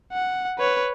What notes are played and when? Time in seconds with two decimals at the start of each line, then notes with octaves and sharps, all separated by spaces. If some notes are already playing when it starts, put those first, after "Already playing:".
0.12 F#5
0.59 B4 C#5